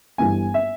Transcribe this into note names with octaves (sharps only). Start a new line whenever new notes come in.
G1 G2 E3 G3 G#5
E5